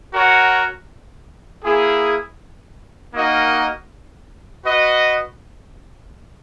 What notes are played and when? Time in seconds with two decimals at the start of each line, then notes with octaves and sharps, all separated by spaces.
0.12 F#4 A#4 C#5 F#5
1.63 A#3 E4 G#4
3.14 A#3 D#4 F#4 A#4 D#5
4.65 F#4 B4 D#5